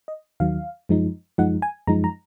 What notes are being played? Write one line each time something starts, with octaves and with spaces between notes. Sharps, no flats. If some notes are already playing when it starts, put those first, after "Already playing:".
D#5
D#2 D#3 F#3 F5
F#2 F3 G#3 D#4
F#2 F3 G#3 D#4 F#5
G#5
F#2 F3 G#3 D#4 A#5
A#5